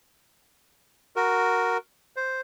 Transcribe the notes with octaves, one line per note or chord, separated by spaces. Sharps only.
F#4 A#4
C5